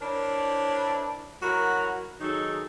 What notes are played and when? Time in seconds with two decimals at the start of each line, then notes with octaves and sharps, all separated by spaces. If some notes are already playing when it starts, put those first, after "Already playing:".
0.01 D4 E4 A#4 C5 C#5
1.42 F#3 E4 F#4 A#4
2.20 D#3 F#3 D#4 G#4 A4